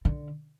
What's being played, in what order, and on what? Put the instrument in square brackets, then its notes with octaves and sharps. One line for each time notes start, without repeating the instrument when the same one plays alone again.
[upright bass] D3